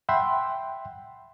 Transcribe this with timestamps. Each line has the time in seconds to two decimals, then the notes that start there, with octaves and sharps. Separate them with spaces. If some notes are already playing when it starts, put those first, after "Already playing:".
0.09 E5 F#5 G5 B5 C6